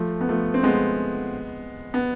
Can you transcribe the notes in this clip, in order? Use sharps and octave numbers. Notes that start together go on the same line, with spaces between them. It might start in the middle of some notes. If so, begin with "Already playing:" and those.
Already playing: F3 A3
B3
F3 A3
C4
G#3 B3
B3